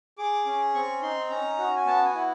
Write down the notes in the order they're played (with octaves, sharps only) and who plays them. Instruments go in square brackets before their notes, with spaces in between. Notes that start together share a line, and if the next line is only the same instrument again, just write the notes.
[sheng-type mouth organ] G#4 D6
C#4
C4 C#6
D#4 C6
C#4 A#5
F#4
G#5
B3 A5
G#5
E4